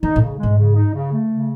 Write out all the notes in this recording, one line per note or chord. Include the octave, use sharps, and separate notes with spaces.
D#3 D#4
A2
C#3
G#2 G#3
C#3
D#4
C#3
A3
C#3